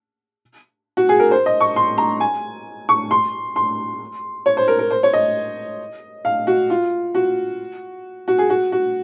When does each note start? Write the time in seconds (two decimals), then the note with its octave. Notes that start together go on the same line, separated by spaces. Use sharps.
0.97 F#4
1.09 G#4
1.20 A#4
1.31 C5
1.46 D#5
1.61 C#6
1.76 C6
1.98 A#5
2.20 G#5
2.89 C#6
3.11 C6
3.56 C6
4.46 C#5
4.57 C5
4.68 A#4
4.79 A#4
4.91 C5
5.03 C#5
5.13 D#5
6.25 F5
6.47 F#4
6.70 F4
7.15 F#4
8.28 F#4
8.38 G#4
8.50 F#4
8.72 F#4